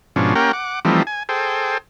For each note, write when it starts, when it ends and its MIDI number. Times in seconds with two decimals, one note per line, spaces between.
0.16 0.34 44
0.16 0.34 47
0.16 0.34 53
0.16 0.34 61
0.16 0.34 62
0.35 0.52 58
0.35 0.52 61
0.35 0.52 67
0.35 0.52 70
0.35 0.52 78
0.35 0.52 79
0.53 0.80 78
0.53 0.80 86
0.85 1.03 52
0.85 1.03 53
0.85 1.03 55
0.85 1.03 57
0.85 1.03 60
0.85 1.03 63
1.07 1.23 80
1.29 1.78 68
1.29 1.78 69
1.29 1.78 72
1.29 1.78 79